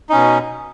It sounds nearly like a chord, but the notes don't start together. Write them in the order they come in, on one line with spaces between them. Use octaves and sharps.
D#4 C#4 B2